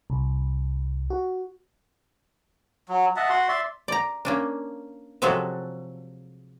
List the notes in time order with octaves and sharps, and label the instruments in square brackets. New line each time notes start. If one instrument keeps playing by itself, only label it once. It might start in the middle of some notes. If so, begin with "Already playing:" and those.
[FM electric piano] C2
F#4
[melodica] F#3
D#5 E5 F#5 A5
F#4 F#5 C6
D5 E5 C6
[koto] D5 A#5
A#3 C#4 D4
C3 F3 F#3 G#3 F#4 A4